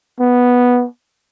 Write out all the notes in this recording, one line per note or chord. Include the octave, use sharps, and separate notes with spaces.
B3